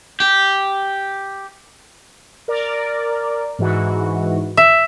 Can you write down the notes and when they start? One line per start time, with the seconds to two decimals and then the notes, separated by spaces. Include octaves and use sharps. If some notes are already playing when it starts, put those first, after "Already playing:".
0.20 G4
2.48 A#4 D5
3.59 G#2 E3 F#4
4.57 E5